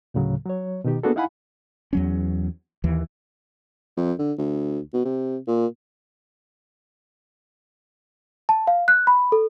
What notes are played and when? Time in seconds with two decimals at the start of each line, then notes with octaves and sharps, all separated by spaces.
0.14 D2 A2 C#3 F#3
0.46 F#3 C#5
0.84 B2 D#3 D#4 G4
1.03 A#3 B3 D4 F#4 G#4 A4
1.16 D#4 E4 F5 F#5 G#5 B5
1.93 E2 F#3 C#4
2.84 D#2 E3
3.97 F2
4.19 D3
4.38 D2
4.93 B2
5.05 C3
5.48 A#2
8.49 A5
8.67 F5
8.88 F#6
9.07 B5
9.32 A4